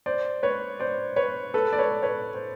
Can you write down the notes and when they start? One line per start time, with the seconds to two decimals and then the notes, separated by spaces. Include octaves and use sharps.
0.06 C5 D5
0.43 B4 C#5
0.80 C5 D5
1.16 B4 C#5
1.54 A4 B4
1.73 D5
1.78 B4 C#5
2.03 B4 C#5
2.34 C5